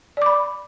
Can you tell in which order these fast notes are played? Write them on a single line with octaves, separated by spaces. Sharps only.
D5 D6 B5